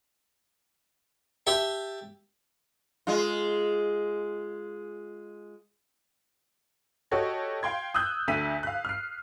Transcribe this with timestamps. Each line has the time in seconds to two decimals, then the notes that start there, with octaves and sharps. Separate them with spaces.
1.47 G4 E5 A5
3.07 G#3 F4
7.11 F#4 G4 A4 C#5 D#5
7.63 F5 G5 C6 G#6
7.94 D#6 E6 F#6 G6
8.28 D2 D3 B6 D#7
8.63 F5 F#6
8.85 F6 C7